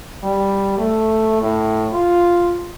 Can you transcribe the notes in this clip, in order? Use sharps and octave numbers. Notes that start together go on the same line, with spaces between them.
G3
A3
A2
F4